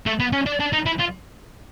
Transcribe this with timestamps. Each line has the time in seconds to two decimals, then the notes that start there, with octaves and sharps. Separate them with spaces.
0.06 A3
0.20 B3
0.33 C#4
0.46 D4
0.60 D4
0.73 D#4
0.86 E4
0.99 F4